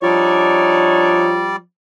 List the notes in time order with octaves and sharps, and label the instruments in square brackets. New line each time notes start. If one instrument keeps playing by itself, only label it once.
[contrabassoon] F3 [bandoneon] G3 D5 [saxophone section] D4 D#4 C#5